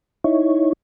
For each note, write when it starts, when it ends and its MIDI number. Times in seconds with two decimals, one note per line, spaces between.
0.24 0.73 63
0.24 0.73 64
0.24 0.73 73